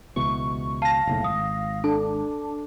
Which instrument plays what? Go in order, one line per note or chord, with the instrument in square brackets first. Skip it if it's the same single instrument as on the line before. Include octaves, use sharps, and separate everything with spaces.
[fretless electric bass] C#2 B2 E3 [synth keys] C#6
[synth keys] F5 A#6 [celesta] A5
[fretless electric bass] F#1 B1 A2
[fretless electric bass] G#1 [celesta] D#6
[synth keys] D4 [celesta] A4